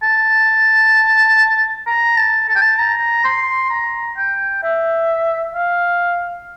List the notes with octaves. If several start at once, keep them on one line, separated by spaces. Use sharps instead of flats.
A5
A#5
A5
A5
G5
A5
A#5
C6
A#5
G5
E5
F5